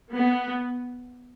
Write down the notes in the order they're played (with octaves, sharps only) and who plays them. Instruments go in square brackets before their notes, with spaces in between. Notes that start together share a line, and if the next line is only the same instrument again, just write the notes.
[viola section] B3